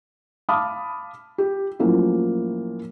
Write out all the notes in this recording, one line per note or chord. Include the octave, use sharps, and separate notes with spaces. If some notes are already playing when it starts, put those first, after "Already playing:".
F5 A5 B5 D6 D#6 F6
G4
A2 F3 F#3 A#3 C#4 E4